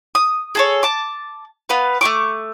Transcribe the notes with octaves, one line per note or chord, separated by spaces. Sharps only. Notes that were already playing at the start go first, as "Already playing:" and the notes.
D#6
G#4 A4 C#5
A5 D6
B3 B4 F5
A3 F#4 C#6 D6